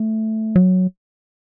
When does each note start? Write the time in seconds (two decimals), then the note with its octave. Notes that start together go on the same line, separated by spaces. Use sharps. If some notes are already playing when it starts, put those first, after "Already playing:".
Already playing: A3
0.56 F#3